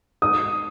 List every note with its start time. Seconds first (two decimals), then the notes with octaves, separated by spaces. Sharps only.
0.22 D#6